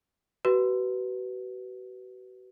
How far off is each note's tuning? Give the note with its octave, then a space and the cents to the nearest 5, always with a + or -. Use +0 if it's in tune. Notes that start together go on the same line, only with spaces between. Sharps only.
F#4 +35 B4 +0